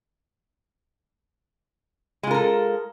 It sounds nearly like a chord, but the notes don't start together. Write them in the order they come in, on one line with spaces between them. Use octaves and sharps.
G#3 F4 A#4 A4